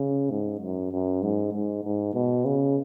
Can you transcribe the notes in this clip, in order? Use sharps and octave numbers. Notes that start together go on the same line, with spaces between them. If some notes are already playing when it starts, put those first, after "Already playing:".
Already playing: C#3
G#2
F#2
F#2
G#2
G#2
G#2
B2
C#3